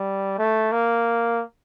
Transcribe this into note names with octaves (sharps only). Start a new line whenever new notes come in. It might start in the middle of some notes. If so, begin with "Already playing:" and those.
Already playing: G3
A3
A#3